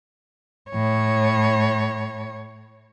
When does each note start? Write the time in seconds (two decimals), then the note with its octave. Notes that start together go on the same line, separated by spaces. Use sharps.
0.71 A2 C#5